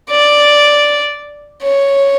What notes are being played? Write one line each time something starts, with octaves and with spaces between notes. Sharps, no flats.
D5
C#5